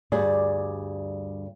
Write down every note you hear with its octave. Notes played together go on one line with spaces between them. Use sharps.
D2 G2 G3 G#4 D5